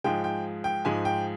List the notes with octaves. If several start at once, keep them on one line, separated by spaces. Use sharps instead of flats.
G#2 F3 G#3 G5
G5
G5
G#2 F3 G#3 G#5
G5